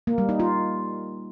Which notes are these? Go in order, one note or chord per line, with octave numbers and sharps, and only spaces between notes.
A#3
G3
D#4
F4